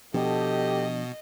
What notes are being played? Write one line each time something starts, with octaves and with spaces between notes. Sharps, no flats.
B2 F3 B3 D4 G4 A4 D#5